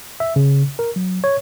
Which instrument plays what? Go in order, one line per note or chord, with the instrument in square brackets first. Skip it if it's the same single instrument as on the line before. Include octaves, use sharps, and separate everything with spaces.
[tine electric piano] E5
C#3
A#4
F#3
C#5